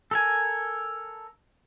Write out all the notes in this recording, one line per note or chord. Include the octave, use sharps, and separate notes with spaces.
A4 A#4 G#5